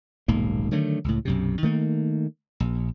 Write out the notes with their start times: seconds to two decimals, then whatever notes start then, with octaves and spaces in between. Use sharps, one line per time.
0.28 D#1 B1 G#2 A#3
0.71 D3 D#3 F#3 A3
1.04 C#2 A2
1.25 B1 F#2 C3
1.63 D#3 A3 A#3
2.60 A#1